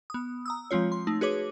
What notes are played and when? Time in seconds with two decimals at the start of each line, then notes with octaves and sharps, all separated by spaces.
0.10 B3 D#6
0.46 A#5 D#6 E6
0.71 F3 G#3 C4 F4 C#5
0.92 C6
1.07 A3 D#4
1.21 F#4 G#4 B4 C#5 D6